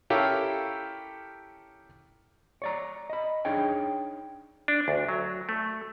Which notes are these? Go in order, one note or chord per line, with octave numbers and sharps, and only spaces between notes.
C#4 E4 G4 A4 A#4 F5
C#5 D5 A#5
D#5 B5
D4 D#4 G#4 C#5 G5
D4
D2
F#3
A3